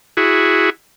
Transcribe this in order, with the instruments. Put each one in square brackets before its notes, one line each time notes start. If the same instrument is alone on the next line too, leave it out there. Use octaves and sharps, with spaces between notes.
[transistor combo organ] E4 F#4 G#4